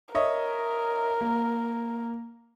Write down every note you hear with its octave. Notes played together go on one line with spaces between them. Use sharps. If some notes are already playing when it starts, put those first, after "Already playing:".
A#4 C#5 D#5 E5
A#3